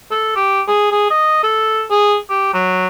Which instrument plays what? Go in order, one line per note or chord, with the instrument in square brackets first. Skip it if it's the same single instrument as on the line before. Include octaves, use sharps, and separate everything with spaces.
[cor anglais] A4
G4
G#4
G#4
D#5
A4
G#4
G4
F#3